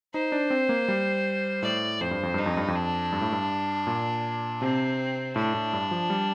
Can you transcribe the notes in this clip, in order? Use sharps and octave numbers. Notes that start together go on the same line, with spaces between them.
D#4 C5
D4
C4
A#3
G3
A2 D5
F2 C5
G2
F2
G2 D#4
F2
G2
F2
D4
G2
A2
G2
A#2
C3 C4
A2 D4
A2
G2
F3
G3